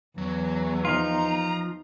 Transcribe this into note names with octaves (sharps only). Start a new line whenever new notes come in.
E2 F#3
F3 D#4 F4 A#5